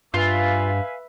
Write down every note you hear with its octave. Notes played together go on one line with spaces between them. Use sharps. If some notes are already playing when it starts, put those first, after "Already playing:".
G2 F4 B4 E5 F5 G#5